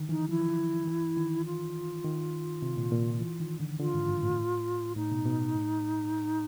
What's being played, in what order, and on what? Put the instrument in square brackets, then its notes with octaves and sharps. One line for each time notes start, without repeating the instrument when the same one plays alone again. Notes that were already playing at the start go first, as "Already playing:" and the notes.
Already playing: [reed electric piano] D3 D#3
[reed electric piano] E3 [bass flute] D#4
[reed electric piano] F3 [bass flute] E4
[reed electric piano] E3
D#3
[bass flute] F4
[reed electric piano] D#3
C3
A#2
A#2
E3
D#3
D3
[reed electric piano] D3 [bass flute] F4
[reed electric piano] G#2
G2
A2
[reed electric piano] A2 [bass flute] D#4
[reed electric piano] B2
B2
A2